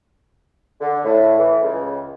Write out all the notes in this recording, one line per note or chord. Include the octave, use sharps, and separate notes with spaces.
D3
A2
E3
C#2